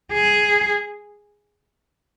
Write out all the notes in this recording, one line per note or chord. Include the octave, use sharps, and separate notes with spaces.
G#4